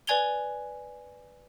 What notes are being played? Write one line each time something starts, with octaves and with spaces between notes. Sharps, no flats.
B4 D5 G#5 G#6 F7 G7